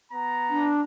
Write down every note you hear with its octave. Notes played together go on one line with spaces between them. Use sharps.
B3 A#5
D4